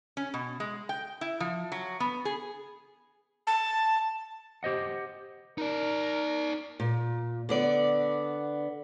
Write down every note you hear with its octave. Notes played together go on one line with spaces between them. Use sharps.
C#4
B2
G#3
G5
E4
F3
F#3
B3
G#4
A5
G4 C5 D#5 F#5
D#4 A#4 D5
A#2
D3 B3 D5